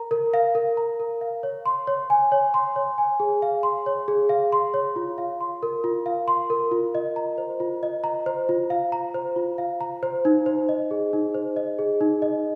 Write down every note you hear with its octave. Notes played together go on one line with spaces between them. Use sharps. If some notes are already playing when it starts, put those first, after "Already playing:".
Already playing: A#4 A#5
A#4
F5
A#4
A#5
A#4
F5
C#5
C6
C#5
G#5
C#5
C6
C#5
G#5
G#4
F5
C6
C#5
G#4
F5
C6
C#5
F4
F5
C6
A#4
F4
F5
C6
A#4
F4
D#5
A#5
C5
F4
D#5
A#5
C5
F4
F5
A#5
C5
F4
F5
A#5
C5
D#4
C5
D#5
G#4
D#4
C5
D#5
G#4
D#4
D#5